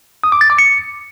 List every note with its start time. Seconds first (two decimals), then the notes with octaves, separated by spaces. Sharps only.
0.24 D#6
0.32 D6
0.41 A6
0.50 D6
0.58 C#7